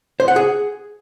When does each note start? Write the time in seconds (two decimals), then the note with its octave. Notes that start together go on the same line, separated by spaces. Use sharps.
0.20 C5
0.28 F#5
0.36 G#4